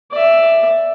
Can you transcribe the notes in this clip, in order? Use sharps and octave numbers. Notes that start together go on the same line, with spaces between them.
D5 E5